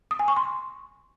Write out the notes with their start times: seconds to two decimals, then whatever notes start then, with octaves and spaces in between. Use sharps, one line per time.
0.11 D#6
0.19 G#5
0.28 C#6
0.37 C6